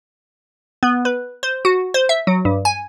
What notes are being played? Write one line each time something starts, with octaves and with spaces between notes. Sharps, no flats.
B3
B4
C5
F#4
C5
E5
F#3
G2
G#5